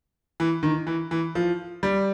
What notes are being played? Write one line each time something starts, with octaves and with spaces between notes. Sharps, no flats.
E3
D#3
E3
E3
F3
G3